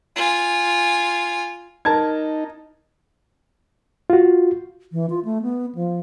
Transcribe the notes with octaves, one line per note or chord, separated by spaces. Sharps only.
F4 G#5
D#4 A#4 A5 G#6
F4 F#4
E3
F4
A3
B3
F3